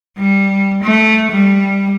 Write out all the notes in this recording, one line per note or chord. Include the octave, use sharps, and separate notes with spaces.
G3
A3
G3